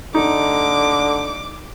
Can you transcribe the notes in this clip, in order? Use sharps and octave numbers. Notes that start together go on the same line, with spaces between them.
D3 D#4 D6